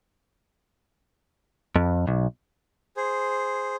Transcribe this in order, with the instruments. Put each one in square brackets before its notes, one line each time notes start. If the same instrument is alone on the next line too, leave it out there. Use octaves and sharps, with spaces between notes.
[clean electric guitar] F2
B1
[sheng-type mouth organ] G#4 C5